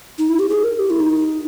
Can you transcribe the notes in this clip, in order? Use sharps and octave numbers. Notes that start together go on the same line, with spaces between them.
D#4
E4
G4
G#4
A#4
G4
E4
D#4